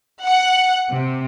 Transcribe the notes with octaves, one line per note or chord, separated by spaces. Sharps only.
F#5
C3